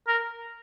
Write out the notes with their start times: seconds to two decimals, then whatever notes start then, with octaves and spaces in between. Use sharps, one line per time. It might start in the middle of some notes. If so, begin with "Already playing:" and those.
0.08 A#4